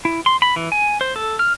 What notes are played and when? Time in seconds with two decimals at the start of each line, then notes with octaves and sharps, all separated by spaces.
0.05 E4
0.26 C6
0.42 B5
0.56 E3
0.72 G#5
1.01 C5
1.16 A4
1.39 F6